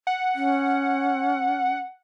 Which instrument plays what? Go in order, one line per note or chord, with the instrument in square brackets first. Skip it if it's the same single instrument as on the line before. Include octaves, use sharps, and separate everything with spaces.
[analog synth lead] F#5
[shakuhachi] C#4